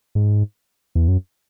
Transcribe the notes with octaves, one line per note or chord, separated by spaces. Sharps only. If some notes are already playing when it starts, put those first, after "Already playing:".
G#2
E2
F#2